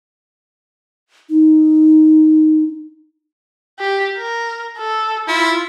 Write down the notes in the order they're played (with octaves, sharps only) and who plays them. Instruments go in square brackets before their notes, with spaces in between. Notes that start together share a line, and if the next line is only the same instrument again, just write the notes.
[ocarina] D#4
[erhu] G4
A#4
A4
[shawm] E4 [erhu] F4